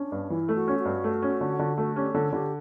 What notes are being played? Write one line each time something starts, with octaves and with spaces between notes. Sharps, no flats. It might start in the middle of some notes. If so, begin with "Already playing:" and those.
Already playing: C#4 D4
G2
E3 E4
A3
F#4
C#4
F#4
G2
A3
C#4
D3
D3
A3 F#4
C#4 G4
D3 A4
D3 G4